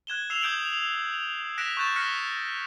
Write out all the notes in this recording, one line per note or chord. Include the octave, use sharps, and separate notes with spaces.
F#6 G#6 E7 G7
E6 C7 E7 F7
D#6 G6 G#6 D7 E7 F#7
F#6 A#6 B6 D7 E7
C#6 F#6 G6 A6 E7
F6 F#6 A#6 B6 C#7